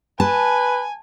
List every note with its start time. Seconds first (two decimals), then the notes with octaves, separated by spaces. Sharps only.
0.20 B4 G#5 A5